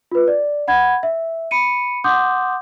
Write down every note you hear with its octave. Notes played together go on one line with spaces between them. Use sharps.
F4 B4
D5
F#5 B5 G#6
E5
B5 C#7 D#7
F#5 C6 D6 D#6 G6